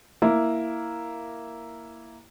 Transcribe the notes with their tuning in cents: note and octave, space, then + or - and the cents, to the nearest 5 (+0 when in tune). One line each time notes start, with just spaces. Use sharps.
A#3 +0 E4 +0